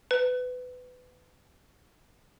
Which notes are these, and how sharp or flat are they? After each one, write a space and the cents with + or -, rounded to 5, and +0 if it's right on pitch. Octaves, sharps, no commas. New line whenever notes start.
B4 +20